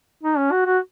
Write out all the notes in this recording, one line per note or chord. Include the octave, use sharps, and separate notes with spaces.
D#4
C#4
F#4
F#4